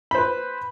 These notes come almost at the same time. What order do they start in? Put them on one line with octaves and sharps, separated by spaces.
B5 C5 B4